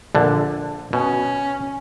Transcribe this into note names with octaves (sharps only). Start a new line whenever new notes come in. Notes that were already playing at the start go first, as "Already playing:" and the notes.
A#1 D3
B2 C#4